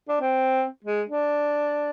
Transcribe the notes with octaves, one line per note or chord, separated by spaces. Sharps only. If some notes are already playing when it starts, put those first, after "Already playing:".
D4
C4
G#3
D4